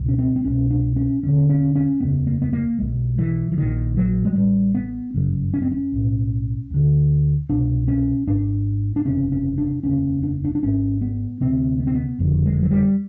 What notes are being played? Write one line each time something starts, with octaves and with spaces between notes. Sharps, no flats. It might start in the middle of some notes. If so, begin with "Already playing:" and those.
Already playing: C#2 B2
C#4
C4
C4
C2 B2 C#4
D4
C#4
E1 D#2 D3 C#4
C#4
C#4
F1 D#2 C#3 B3
A#3
B3
A#3
B1 B2 G#3
E3
E3
A#1 A#2 D#3
F#3
G#3
A1 A2 G3
B3
G1 F#2 C#3
C#4
C4
C#4
B1 A2
D2 D3
C2 B2 D4
C#4
G#1 G#2 D4
D4
F#1 E2 C3 C#4
C#4
D4
F1 D#2 C#3 C#4
D4
D4
D4
G#1 G#2 C#4
B3
D2 C3 C4
B3
C4
B3
F#1 F2 D3
G#3
F#3
G3